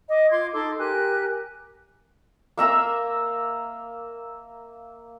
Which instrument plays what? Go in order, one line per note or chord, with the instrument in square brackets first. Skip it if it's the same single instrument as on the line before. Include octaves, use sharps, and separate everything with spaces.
[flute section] D#5 D6
F4 C6 D6 G#6
D#4 A4 C6 D6
G4 A#4 G#5 F#6
[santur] A#3 E5 A#5 E6